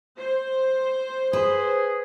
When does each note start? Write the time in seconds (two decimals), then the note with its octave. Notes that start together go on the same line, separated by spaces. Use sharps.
0.17 C5
1.33 G#4 B4